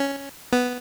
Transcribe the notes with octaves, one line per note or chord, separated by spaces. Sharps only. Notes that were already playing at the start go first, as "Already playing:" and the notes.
Already playing: C#4
B3